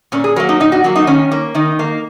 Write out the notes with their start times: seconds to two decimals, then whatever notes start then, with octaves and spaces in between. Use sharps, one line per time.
0.12 A#2 C#4
0.24 G#4
0.36 F#3 A#3 A#4
0.49 D#4
0.60 A#2 D#4
0.72 F#4
0.84 F#3 A#3 F#4
0.96 D#4
1.07 D#3 C#4
1.32 A#3
1.55 D#3 D#4
1.79 A#3